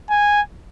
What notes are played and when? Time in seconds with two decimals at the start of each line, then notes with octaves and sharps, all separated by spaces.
0.10 G#5